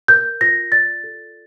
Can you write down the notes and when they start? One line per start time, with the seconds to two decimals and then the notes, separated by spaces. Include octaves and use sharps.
0.08 A#4 G6
0.41 F4 A#6
0.72 D5 A6
1.04 A4